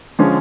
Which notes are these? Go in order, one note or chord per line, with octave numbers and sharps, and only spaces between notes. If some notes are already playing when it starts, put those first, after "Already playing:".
D3 F3 G#3 C#4